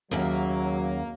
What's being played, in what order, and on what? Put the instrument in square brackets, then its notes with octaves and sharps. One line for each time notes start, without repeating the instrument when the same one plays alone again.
[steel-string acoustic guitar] D#2 C#3 E5 [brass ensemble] F#3 [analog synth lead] A#3